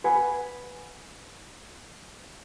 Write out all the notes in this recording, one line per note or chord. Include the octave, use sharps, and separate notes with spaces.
B4 F#5 G#5